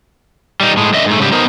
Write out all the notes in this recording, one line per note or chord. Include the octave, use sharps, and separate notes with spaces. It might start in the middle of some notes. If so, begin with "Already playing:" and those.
G3 D#4
A2 G#3
F#2 D3 D#5 E5
G#2 A3
G#2 C#3 F#3 G3 E4 G4
B3 D#4 A#4 C5